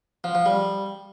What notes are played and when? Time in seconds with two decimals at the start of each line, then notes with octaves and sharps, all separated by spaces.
0.24 F3
0.35 F3
0.46 G3